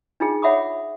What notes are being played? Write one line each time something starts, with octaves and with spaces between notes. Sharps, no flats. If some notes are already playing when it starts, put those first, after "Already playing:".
D4 D#4 F4 G#4
C#5 E5 F#5 B5 D6 D#6